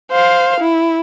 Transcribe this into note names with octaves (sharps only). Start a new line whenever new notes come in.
C5 F5
E4